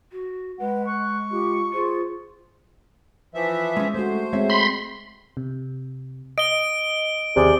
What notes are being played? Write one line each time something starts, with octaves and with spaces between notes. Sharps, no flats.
F#4
G#3 B4 F#5
C#6 F#6
F4 G4
F4 G#4 C5
E3 F3 E5
G#3 C#4
A3 F#4 C5
G#3 C4 C#5 E5
B5 C6
C3
D#5 D7 G7
D#2 C3 G#4 D5